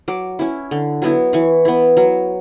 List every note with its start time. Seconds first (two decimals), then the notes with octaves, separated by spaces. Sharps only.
0.08 F#3 D6
0.39 C#4 E4
0.71 D3
1.02 F#3 B3 E4
1.33 E3 C#6
1.65 B3 E4
1.97 F#3